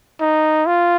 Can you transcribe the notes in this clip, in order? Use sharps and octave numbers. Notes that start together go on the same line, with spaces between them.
D#4
F4